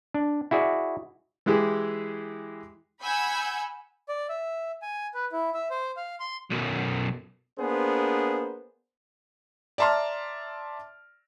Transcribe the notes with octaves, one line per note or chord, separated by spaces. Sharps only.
D4
E4 F#4 G#4 D5
E3 G#3 E4 G4 G#4
F#5 G#5 B5 E6 G6 G#6
D5
E5
G#5
B4
E4
E5
C5
F5
C6
B1 F#2
A#3 B3 D4 G#4 C5
D5 E5 A5 A#5 C6 F6